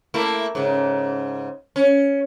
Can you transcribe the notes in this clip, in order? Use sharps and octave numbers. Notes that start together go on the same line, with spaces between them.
A3 A#3 E4
G#2 C#3
C#4